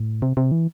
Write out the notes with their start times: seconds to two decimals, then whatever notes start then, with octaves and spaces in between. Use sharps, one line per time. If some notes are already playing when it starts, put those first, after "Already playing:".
Already playing: A2
0.22 C3
0.37 C3
0.52 E3